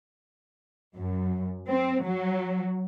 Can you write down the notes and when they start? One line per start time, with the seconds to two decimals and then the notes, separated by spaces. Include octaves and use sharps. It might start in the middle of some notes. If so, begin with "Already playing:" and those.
0.95 F#2
1.68 C4
2.03 F#3